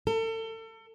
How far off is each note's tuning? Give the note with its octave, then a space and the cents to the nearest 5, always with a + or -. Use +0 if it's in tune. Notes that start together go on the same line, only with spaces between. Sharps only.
A4 +35